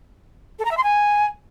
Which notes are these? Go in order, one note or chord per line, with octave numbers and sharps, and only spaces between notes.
A4
A#5
E5
C6
G#5